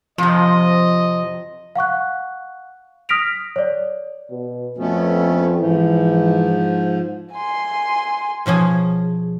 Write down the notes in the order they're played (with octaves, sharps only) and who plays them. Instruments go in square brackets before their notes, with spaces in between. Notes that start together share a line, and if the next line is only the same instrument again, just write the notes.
[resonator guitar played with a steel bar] F2 C3 [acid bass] F3 [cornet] D#5
[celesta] F5 F#5 C#6 F#6
D#6 F6 A#6 B6 D7 F7
C#5 D5
[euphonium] B2
[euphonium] F2 [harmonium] A3 B3 C#4
[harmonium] G#2 F3 [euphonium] E3
[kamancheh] G#5 C6
[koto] B2 F3 C#4 G#4